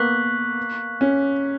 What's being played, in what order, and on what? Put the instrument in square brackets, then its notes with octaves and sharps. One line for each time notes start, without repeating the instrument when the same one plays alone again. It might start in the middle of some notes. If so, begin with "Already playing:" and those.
Already playing: [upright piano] A#3 B3 [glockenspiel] C#6 F#6 B6 F#7
[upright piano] C#4